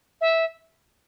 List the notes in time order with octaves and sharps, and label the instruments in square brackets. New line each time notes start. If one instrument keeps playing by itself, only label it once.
[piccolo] E5